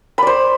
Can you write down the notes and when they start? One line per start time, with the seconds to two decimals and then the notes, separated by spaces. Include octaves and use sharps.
0.18 B5
0.22 D5
0.27 C5